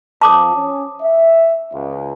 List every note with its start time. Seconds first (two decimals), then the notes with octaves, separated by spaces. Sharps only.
0.21 F2 A5 D6 D#6
0.54 C#4
1.01 E5
1.72 C#2